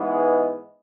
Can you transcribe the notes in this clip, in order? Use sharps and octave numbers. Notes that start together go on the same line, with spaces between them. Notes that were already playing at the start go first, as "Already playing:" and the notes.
Already playing: G#2 E3 G#3 B3